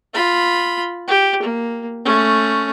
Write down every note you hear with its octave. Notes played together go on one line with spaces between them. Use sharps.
F4 B5
G4
A#3
A3 C#4